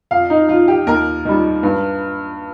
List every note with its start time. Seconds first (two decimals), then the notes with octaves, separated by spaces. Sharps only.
0.11 F2 F5
0.30 D#4
0.48 F3 F4
0.68 G4
0.87 D#2 A#4
1.25 D#3 G3
1.63 G2